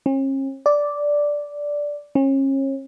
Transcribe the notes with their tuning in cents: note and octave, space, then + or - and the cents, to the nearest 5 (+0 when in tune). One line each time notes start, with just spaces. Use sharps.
C#4 -45
D5 -5
C#4 -35